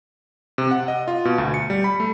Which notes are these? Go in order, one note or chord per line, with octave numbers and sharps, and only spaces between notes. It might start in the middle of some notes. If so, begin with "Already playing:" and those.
C3
F#5
D#5
F4
B2
D2
C#7
G3
B5
A3